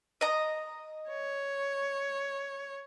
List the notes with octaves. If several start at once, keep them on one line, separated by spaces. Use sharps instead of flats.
D#5 A#5
C#5